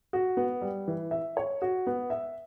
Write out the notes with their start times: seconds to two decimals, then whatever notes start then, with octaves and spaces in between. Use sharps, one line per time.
0.13 F#4
0.37 B3
0.62 G3
0.88 E3
1.11 E5
1.37 C#5
1.62 F#4
1.87 B3
2.10 E5